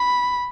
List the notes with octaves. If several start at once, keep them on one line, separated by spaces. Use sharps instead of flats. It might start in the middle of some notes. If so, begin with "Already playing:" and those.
Already playing: B5